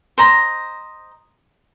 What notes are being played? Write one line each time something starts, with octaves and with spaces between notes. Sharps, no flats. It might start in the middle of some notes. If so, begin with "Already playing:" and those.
C5 D#5 A#5